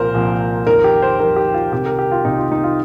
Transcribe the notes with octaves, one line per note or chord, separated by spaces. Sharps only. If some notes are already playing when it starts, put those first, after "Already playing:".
Already playing: C2 A#2 F3 A#4 C5
C2 A#2 F3
F2 D#3 A#4
G4
C5
F2 D#3 A#4
G4
F4
C2 C3 D#3 G4
A#4
G4
F4
C2 C3 D#3 D#4
F4
D#4
F4